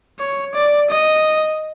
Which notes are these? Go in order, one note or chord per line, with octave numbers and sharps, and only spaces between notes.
C#5
D5
D#5